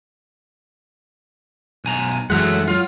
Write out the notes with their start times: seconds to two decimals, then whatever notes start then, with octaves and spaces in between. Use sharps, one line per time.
1.85 B1 G#5 A#5
2.30 F#2 E3 F#3 G#3 A4 E5 F#5
2.68 F#3 F4